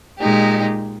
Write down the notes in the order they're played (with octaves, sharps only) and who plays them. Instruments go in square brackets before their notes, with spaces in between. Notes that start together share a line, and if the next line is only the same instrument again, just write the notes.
[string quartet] A#2 G#3 D#4 G4